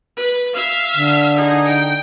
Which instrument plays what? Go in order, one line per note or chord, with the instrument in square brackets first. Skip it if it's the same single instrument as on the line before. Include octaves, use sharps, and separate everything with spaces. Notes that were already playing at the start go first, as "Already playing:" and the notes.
[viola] B4
E5 F5
[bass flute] D3
[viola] D#4 G#4
G5